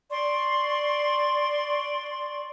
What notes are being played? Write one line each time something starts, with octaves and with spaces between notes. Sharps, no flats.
D5 C6 C#6